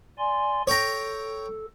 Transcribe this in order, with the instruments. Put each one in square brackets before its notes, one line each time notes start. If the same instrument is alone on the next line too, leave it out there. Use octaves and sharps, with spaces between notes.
[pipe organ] D5 G#5 C6
[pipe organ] A4 [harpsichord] C#5 G5 A#5